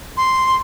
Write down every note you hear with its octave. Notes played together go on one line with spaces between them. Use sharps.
C6